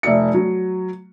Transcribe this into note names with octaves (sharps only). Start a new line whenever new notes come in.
F1 D5 E5 C#7
F#3